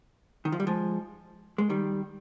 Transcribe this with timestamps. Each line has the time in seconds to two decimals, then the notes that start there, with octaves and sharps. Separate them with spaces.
0.45 D#3
0.52 F3
0.60 G3
0.67 F3 G#3
1.58 G#3
1.69 D#3 G3